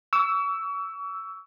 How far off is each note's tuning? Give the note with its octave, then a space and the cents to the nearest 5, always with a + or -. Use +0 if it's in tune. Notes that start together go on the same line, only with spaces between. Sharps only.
C#6 +40 E6 +0